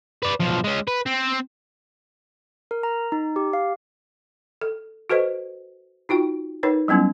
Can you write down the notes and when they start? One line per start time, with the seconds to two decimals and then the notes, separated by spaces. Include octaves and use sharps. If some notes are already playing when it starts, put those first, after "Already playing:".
0.23 B4 D5
0.40 B1 F3
0.64 G#3 C#4
0.88 B4
1.06 C4
2.71 A#4
2.83 A#5
3.12 D#4
3.36 G4
3.53 F5
4.62 A4
5.10 F#4 A4 B4 C5 D#5
6.09 D#4 F4 F#4 G5
6.63 D#4 A#4 B4 C#5
6.88 F#3 G3 B3 C#4 E4